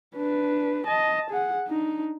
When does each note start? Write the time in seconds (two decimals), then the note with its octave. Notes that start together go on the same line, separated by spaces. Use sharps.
0.17 D4 B4
0.87 D#5 A5
1.31 G#4 F#5
1.67 D4 D#4